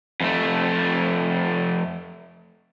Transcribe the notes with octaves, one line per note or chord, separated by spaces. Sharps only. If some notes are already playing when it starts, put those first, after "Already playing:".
F2 A3